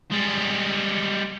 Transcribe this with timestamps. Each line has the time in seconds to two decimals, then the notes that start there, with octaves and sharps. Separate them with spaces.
0.12 G3 G#3